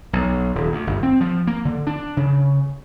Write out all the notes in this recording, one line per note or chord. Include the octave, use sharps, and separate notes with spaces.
B1
D#1
D2
G1
C4
F3
A#3
D3
D4
C#3